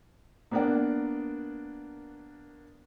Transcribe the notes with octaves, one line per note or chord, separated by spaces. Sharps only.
A#3 B3 D4 A#4 D5 F#5